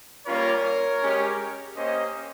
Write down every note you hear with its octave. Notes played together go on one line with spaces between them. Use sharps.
G3 A#3 C#4 F4 A#4 C#5
G#3 C#4 G4
A#3 C#4 G4 C5 D#5